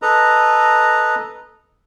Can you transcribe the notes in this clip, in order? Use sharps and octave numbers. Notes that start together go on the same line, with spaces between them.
A4 B4 D#5 A#5